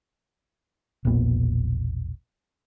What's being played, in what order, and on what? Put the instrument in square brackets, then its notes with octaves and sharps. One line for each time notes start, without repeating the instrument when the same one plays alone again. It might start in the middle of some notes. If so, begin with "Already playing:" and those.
[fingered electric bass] E1 A#1 A#2 B3